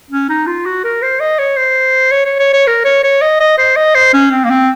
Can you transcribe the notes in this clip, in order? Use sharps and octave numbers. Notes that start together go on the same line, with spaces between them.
C#4
D#4
F4
F#4
A#4
C5
D#5
C#5
C5
C#5
C#5
C#5
C#5
A#4
C#5
C#5
D#5
D#5
C5
D#5
C5
C#4
C4
A#3
C4